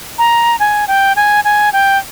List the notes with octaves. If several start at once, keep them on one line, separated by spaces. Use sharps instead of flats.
A#5
G#5
G5
G#5
G#5
G5